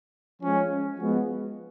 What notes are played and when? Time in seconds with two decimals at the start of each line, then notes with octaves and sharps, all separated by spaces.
0.42 F3 G#3 C#4
0.99 F3 G#3 B3 F#4